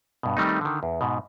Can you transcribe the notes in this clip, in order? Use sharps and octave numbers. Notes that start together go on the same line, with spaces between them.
G2 B2
D#3 G3 A3 C4 D#4
D3 D#3
E2
G#2 B2